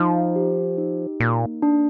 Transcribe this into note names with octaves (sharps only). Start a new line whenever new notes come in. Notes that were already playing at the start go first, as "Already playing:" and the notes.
Already playing: F3 D#4
G4
D#4
A#2 A#3
D4